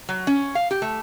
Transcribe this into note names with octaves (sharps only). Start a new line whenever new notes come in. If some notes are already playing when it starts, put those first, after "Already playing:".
F#3
C#4
F5
G4
A3